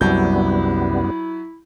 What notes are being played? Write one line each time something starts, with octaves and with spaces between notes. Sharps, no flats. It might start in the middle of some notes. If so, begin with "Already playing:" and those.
C2 F#2 F#3 G3 B3 E4 G6